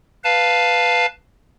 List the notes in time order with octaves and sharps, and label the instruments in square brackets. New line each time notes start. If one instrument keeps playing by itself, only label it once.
[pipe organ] B4 F5 A5